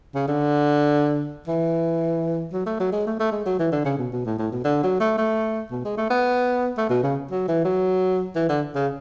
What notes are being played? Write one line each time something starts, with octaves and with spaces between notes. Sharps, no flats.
C#3
D3
E3
F#3
A3
F#3
G#3
A3
A3
G#3
F#3
E3
D3
C#3
B2
B2
A2
A2
B2
D3
F#3
A3
A3
B2
G#3
A3
B3
A3
B2
C#3
F#3
E3
F#3
E3
D3
C#3